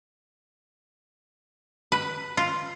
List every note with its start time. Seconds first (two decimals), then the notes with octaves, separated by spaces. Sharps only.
1.92 B4
2.37 F4